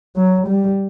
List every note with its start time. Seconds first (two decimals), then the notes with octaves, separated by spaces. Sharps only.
0.16 F#3
0.47 G3